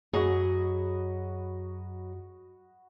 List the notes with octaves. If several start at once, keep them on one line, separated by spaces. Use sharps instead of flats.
F#2 F#3 F#4 G#4 D#5 B5